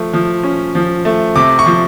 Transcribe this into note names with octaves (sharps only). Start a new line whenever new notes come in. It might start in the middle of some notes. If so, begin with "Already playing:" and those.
Already playing: F3 A3
F3
C#4
F3
A3
C3 D6
C#6
F3